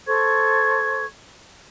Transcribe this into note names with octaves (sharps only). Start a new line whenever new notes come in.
A4 C5 C#6 G#6